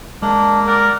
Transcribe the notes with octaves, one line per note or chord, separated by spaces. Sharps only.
G#3 A#3 D4
A#4 D5 F#5